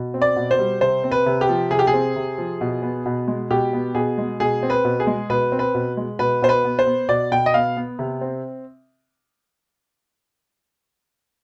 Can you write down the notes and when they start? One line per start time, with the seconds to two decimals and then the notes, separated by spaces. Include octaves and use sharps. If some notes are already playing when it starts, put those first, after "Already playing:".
Already playing: B2
0.14 C4
0.22 D5
0.36 B2
0.51 C5
0.59 G3
0.81 C3 C5
1.04 C4
1.11 B4
1.26 C3
1.41 G4
1.49 F3
1.71 C3 G#4
1.79 G4
1.87 G#4
1.94 C4
2.16 C3
2.38 F3
2.61 B2
2.82 B3
3.06 B2
3.28 G#3
3.51 B2 G4
3.73 B3
3.95 B2 G#4
4.18 G#3
4.40 B2 G#4
4.63 C4
4.70 B4
4.85 B2
5.00 G#4
5.07 G#3
5.30 B2 B4
5.52 C4
5.59 B4
5.75 B2
5.97 G#3
6.19 B2 B4
6.42 B2 C5
6.49 B4
6.64 B3
6.79 C5
6.86 B3
7.09 B2 D5
7.31 B2 G5
7.46 D#5
7.54 B3 F5
7.77 B3
7.99 C3
8.21 C4